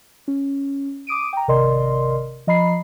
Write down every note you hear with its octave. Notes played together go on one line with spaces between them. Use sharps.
C#4
D6 D#6 D7 D#7
G5 A#5
G#1 C3 A#4 D5 D#5 C6
F3 D#5 A#5 B5 C7